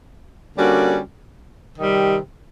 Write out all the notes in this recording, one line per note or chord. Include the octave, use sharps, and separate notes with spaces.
D3 G3 A#3 C#4 F#4
C3 D#3 G3